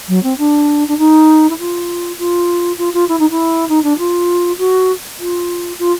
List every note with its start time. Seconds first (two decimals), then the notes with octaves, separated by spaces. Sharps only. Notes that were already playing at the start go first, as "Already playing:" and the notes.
0.08 F#3
0.23 C4
0.38 D4
0.88 D4
0.98 D#4
1.49 E4
1.58 F4
2.18 F4
2.78 F4
2.93 F4
3.08 E4
3.19 D#4
3.30 E4
3.68 D#4
3.83 D4
3.98 F4
4.58 F#4
5.19 F4
5.79 F4